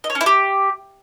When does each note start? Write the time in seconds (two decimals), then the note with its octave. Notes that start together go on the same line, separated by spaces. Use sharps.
0.04 D#5
0.10 C#5
0.15 C#4
0.21 E4
0.26 G4